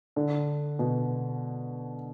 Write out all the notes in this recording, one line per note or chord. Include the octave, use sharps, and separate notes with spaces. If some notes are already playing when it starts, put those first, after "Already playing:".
D3
B2